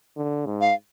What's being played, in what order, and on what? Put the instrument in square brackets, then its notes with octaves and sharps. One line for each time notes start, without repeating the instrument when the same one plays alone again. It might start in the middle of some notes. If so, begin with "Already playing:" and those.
[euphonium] D3
G#2
[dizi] F5